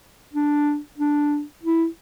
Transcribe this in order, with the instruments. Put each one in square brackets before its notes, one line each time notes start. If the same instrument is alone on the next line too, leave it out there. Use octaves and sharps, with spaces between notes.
[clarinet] D4
D4
E4